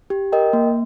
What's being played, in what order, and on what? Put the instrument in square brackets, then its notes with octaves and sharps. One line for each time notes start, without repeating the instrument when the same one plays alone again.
[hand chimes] G4
A#4 D#5 G5
A#3